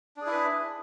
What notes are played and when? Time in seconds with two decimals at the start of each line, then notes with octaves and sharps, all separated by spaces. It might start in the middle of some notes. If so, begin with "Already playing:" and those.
0.17 D4
0.22 G#4
0.26 E4
0.31 B4